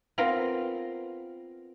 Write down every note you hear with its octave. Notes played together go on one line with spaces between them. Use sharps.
B3 C4 F4 A#4